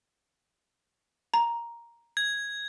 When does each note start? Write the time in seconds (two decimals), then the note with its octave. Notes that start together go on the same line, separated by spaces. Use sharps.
1.34 A#5
2.17 G#6